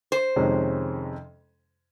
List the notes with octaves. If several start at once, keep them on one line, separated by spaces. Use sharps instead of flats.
C5
F2 C3 D#3 G#3 C#4